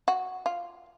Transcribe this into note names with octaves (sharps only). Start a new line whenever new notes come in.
F#4
F4